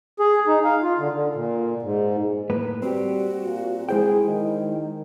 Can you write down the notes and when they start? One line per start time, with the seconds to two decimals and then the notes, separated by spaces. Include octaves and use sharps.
0.20 G#4
0.47 D#4
0.64 F5
0.82 F4
0.99 D3
1.12 D3
1.35 A#2
1.82 G#2
2.50 A2 A#3 B4
2.82 G3 C4 F#4 G4
3.46 A#2
3.89 G#3 E4 G#4 C5 G5
4.27 D#3